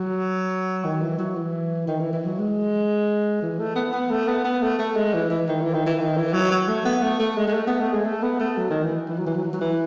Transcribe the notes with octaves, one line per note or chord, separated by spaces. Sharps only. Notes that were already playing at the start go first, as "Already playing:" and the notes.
Already playing: F#3
D#3
E3
F#3
E3
D#3
E3
E3
F#3
G#3
E3
A3
B3
B3
A3
B3
B3
A3
A3
G#3
E3
E3
D#3
E3
D#3
E3
D#3
E3
F#3
F#3
A3
B3
A3
A3
G#3
G#3
A3
B3
A3
G#3
A3
B3
A3
F#3
D#3
E3
E3
F#3
E3
F#3
E3
F#3
E3